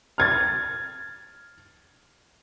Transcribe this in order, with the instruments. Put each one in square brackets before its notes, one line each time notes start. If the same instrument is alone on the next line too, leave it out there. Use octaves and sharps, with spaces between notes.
[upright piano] F6 G#6 A6